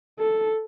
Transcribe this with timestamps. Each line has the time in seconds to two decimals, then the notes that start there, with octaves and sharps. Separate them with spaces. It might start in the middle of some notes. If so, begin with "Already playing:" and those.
0.19 A4